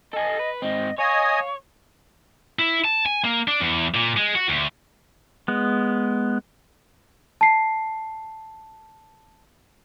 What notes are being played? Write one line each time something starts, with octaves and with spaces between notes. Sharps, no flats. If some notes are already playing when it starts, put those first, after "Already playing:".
A4 D#5 G#5
B4
G#2 C4 D#5
C#5 D#5 F5 G#5 D#6
E4
A5
G#5
A#3
D4
E2
A#2
G#3
F#4
D2
G#3 B3
A5 C7